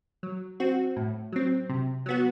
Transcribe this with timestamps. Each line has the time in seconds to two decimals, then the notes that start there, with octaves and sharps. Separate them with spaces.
0.23 F#3
0.60 C4 F#4
0.96 A2
1.32 F#3 C4
1.69 C3
2.06 F#3 B3 F#4